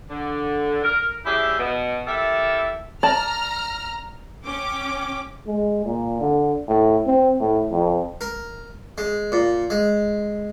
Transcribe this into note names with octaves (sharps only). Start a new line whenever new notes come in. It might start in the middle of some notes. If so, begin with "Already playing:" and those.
D3
A#4
G3 C#4 E4 G4 G#4 E5
B2
E4 G4 A4 A#4 E5
D5 A5 A#5 F6
C#4 G5 D6
G#3
A#2
D3
A2
C4
A2
F2
A#4
G#3
A#2
G#3